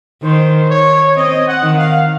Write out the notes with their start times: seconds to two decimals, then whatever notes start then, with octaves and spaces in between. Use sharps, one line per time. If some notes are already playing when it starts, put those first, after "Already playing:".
0.23 D#3 C5
0.70 C#5
1.16 C4 D#5
1.47 F#5
1.63 D#3
1.78 F5